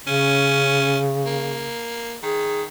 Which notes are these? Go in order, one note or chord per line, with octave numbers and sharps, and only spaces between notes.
C#3 C#4
A#3
D#3 G#4